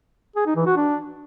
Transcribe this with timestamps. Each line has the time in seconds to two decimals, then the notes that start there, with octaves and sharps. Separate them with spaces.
0.36 G#4
0.46 D#4
0.56 E3
0.66 F#4
0.76 D4